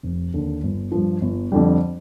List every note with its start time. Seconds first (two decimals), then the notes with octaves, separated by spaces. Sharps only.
0.03 F1
0.34 D#2 D3
0.63 G1
0.92 G2 F3
1.21 G1
1.52 F2 D3 G3